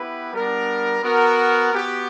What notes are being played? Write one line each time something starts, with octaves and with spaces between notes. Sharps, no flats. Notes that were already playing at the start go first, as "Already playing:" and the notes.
Already playing: B3 E4 G4 B4
G3 B3 D4 A#4
B3 F#4 A#4
B3 F#4 G4